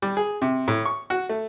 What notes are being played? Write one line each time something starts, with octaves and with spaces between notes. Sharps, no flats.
G3
G#4
C3
A2
C#6
F#4
A3